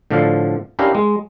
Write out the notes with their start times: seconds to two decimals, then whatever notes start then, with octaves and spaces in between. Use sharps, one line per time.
0.11 A2 D3 F3 D5 F5
0.79 C#4 D4 E4 G4 A#4 F5
0.95 G#3